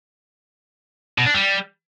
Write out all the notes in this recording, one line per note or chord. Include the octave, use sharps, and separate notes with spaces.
B2
D4
G3